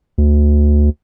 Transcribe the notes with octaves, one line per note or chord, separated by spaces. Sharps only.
D2